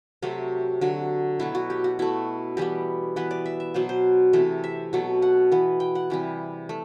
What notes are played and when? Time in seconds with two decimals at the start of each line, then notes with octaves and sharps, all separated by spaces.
0.22 C3 F#3 A3 C4
0.81 D3 F#3 A3
1.39 B2 F#3 A3 E4
1.55 F#4
1.70 G4
1.84 F#4
1.99 B2 A3 E4
2.57 E3 G3 B3 G4
3.16 E3 B3 B4
3.31 D5
3.46 E5
3.60 E5
3.74 B2 F#3 B3 C5
3.89 C5
4.33 C3 E3 A3
4.64 E5
4.93 B2 F#3 A3
5.22 F#5
5.52 E3 B3
5.80 G5
5.95 F#5
6.10 C3 E3 G3
6.69 A3